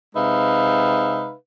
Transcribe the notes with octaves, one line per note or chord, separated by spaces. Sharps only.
C3 G#3 D#4 B4 E5 F5